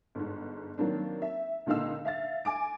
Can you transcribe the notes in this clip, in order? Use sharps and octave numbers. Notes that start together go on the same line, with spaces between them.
G1 G#2
D#3 F#3 A#3 C4 D4
E5
C#2 A#2 D3 D#4 F5 E6
E5 F5 A6
G#5 D6 D7